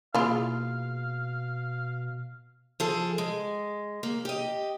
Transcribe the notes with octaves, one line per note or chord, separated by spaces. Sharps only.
B2 A#3 E4 F4 G#4 F5
F3 G#4 A4
G#3
A#3
G4 D#5